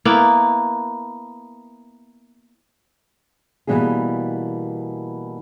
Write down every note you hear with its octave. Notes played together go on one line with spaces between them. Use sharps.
A#3 B3 E4
B2 D3 E3 G3 A#3 G#4